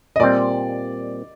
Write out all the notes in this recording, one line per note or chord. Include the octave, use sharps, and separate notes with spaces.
D#5
A#2 G3 C4 D5